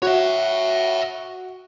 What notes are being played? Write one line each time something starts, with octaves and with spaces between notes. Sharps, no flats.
F#4 C#5 E5